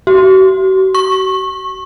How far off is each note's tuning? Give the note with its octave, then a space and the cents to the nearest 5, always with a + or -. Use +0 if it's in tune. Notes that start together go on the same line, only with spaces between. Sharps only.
F#4 +45
C#6 -25